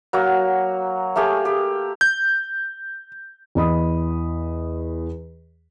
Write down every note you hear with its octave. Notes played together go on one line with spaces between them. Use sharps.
F#3 A#3 F#5
A3 A#3 G4 G#4
G4
G6
E2 D#5 B5 D#6